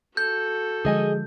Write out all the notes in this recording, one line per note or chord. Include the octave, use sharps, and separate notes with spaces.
F#4 A4 G6
D3 F3 G#3 G#4 D#5 G#5